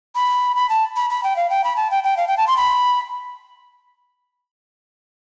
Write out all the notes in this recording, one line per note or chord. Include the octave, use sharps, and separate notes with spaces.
B5
B5
A5
B5
B5
G5
F5
G5
B5
A5
G5
G5
F5
G5
A5
C6
B5